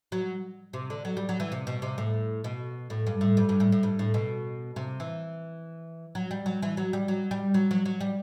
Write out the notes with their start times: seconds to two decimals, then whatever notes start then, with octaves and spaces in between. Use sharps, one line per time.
0.12 F#3
0.73 C3
0.90 D3
1.05 F#3
1.17 G3
1.29 F#3
1.40 E3
1.52 C3
1.67 B2
1.82 C3
1.98 A2
2.44 B2
2.90 A2
3.07 G2
3.21 A2
3.37 G2
3.49 G2
3.60 A2
3.72 A2
3.83 G2
3.99 A2
4.14 B2
4.76 C3
5.00 E3
6.15 F#3
6.31 G3
6.46 F#3
6.62 E3
6.77 F#3
6.93 G3
7.08 F#3
7.31 G3
7.54 F#3
7.71 F#3
7.86 F#3
8.01 G3